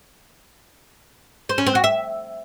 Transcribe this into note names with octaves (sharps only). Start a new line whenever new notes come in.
C5
C#4
C4
F#4
E5